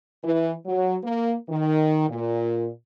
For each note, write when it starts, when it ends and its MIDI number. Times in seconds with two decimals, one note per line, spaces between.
0.23 0.52 52
0.66 0.96 54
1.04 1.33 58
1.50 2.07 51
2.09 2.69 46